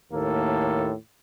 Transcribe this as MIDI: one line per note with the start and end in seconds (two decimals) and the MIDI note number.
0.11 0.92 39
0.11 0.92 45
0.11 0.92 58
0.11 0.92 69